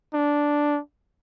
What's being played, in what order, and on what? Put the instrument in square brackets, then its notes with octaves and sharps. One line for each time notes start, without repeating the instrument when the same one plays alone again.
[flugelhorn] D4